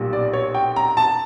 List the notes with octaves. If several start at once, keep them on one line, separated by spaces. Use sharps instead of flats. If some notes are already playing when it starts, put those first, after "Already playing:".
Already playing: B1 A#2 G3
D5
C#5
G5
A#5
A5